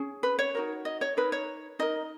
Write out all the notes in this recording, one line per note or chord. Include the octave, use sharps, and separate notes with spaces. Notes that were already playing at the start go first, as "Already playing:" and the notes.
Already playing: C#4 G#4
B4
C#5
D#4 F#4 A#4
D#5
C#5
D#4 A#4 B4
C#5
D#4 A#4 D#5